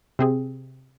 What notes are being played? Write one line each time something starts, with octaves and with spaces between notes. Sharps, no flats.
C3 C4 G#4